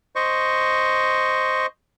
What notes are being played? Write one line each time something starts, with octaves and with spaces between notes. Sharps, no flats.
C5 D#5 C#6